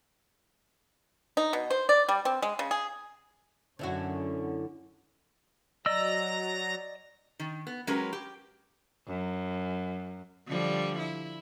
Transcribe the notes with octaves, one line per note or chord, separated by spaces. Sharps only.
D#4
B2
C5
D5
G3
C4
G#3
C#3
G#4
F#2 D3 C#4 E4 F#4
F#3 D5 D#5 A#5 E6 A#6
D#3
B3
F#3 G#3 C#4 G4 A#4 B4
G4
F#2
D3 F3 G3
E4